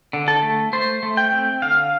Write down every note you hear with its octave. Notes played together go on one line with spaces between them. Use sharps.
D3
A4
A3
A3 C5
A3
G5
C4
D3 F5